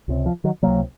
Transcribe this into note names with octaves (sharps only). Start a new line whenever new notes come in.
C#2 C3
F3
D#3 F#3
C#2 C3 F#3 A#3